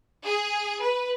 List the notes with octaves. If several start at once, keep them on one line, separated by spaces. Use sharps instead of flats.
G#4
B4